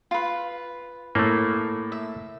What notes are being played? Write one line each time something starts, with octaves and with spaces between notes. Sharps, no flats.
F4 B4
A2 A3 A#3
E5